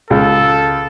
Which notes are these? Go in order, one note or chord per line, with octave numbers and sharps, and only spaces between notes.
C#2 A4